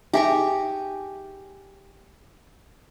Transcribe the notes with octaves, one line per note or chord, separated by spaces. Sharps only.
D#4 G4 G#4 E5 G#5 C#6